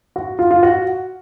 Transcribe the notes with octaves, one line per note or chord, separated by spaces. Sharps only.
F#4
F4
F4
F#4